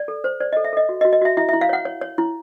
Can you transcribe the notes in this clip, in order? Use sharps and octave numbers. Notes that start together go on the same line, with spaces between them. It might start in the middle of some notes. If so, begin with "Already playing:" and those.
Already playing: D5
A4
C5
C5 D5
D#5
A4
E5
A4 D#5
F#4
D#5
F#4
D#5
F#4 E5
E4 E5
E5
E4
F5
C#5 F#5
C#5
C#5
E4